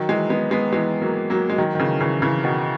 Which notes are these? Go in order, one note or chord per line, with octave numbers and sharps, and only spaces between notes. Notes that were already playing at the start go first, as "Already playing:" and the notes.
Already playing: D#3 F#3
E3 G#3
G#3 B3
G#3 B3
E3 G#3
F#3 A#3
F#3 A#3
G#3
D#3 F#3
D#3
C#3 E3
C#3 E3
C#3 E3
B2 D#3